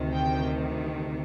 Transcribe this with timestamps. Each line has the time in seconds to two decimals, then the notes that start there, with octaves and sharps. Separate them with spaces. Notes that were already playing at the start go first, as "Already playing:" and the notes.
Already playing: D2 C3 D#3
0.14 G5